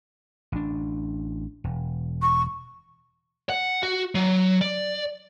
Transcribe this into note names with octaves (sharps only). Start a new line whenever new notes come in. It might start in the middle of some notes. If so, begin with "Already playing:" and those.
A1 D4
E1
C#6
F#5
F#4
F#3
D5